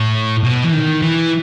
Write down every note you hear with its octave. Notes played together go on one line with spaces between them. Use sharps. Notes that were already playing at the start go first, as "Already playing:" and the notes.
Already playing: A2
B2
E3
D#3
E3